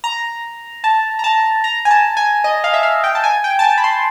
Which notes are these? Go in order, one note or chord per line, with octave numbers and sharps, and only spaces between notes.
A#5
A5
A#5
A5
A#5
G#5
A5
G#5
D#5
F5
E5
F5
G5
A5
G#5
G5
A5
G#5
B5
C6